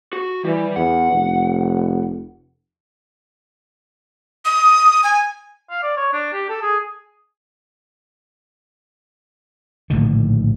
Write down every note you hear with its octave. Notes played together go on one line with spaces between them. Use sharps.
F#4
E3 G3
E2 F#5
F1
D#6
G#5
F5
D5
C#5
D4
G4
A4
G#4
A#1 A2 D3 D#3